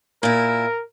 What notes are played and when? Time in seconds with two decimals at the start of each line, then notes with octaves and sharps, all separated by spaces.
0.23 A#2 E4 A#4